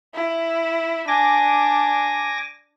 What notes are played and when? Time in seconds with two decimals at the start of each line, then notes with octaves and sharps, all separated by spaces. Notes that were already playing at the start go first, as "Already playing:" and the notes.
0.14 E4
1.08 D4 G#5 D6 A#6